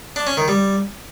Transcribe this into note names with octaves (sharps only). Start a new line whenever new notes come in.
D4
C#4
D#3
G3